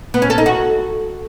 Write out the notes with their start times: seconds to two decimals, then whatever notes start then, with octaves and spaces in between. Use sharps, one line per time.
0.14 B3
0.22 C#4
0.30 A4
0.38 D#4
0.46 F#4